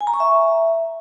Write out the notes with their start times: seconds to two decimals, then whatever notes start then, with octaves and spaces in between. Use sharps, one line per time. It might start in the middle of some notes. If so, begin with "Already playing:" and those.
0.01 G#5
0.07 A#5
0.14 C#6
0.20 E5